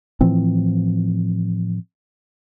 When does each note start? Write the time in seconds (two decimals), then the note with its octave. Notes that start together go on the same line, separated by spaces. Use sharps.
0.21 A2 E3 F3 C4